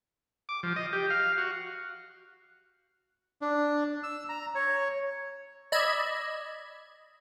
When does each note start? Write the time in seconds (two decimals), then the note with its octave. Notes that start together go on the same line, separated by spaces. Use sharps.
0.49 D6
0.63 F3
0.76 D#5
0.93 G4
1.10 F5
1.38 F#4
3.42 D4
4.03 E6
4.29 A#5
4.55 C#5
5.72 D5 D#5 B5 E6 G#6